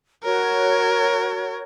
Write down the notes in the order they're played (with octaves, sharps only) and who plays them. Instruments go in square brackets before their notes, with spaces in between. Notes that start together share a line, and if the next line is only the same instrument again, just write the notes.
[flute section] F#4 C#5 [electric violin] A#4